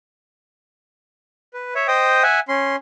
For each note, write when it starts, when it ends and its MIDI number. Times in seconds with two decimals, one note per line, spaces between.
1.54 1.74 71
1.75 1.87 73
1.75 1.87 76
1.88 2.23 72
1.88 2.23 75
1.88 2.23 79
1.88 2.23 87
2.23 2.40 76
2.23 2.40 78
2.23 2.40 80
2.48 2.76 61
2.48 2.76 84